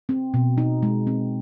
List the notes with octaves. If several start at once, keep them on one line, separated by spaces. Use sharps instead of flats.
C4
B2
D#4
G#3
C4